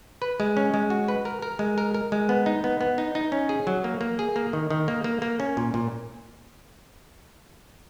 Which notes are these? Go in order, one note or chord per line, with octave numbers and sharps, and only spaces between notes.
B4
G#3
C#4
G#3
F#4
B4
A#4
A#4
G#3
A#4
A#4
G#3
B3
D#4
B3
B3
D#4
D#4
C#4
G#4
F#3
A#3
A#3
G#4
A#3
D#3
D#3
A#3
A#3
A#3
C#4
A#2
A#2